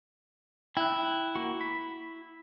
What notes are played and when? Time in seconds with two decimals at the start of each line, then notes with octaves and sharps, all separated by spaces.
0.77 E4 G5 F#6
1.36 A#3 F#4
1.61 B5